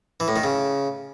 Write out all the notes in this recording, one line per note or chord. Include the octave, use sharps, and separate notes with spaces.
E3
A2
D#3
C#3